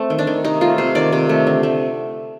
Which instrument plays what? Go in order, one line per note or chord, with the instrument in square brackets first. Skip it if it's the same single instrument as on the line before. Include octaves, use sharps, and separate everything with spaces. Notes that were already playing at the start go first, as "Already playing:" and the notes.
Already playing: [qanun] A3 C4
D#3
D4
D#3
C3 D#4
A3 F4
C3 C5
D#3 D5
C3
A3
D3
A3